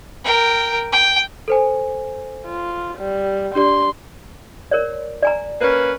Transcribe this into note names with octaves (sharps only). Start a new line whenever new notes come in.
A#4 G5
G5
A4 C5 G#5
F4
G3
D4 G4 D5 C6
A#4 C#5 D5
D5 G#5 A#5
A#3 C#4 B4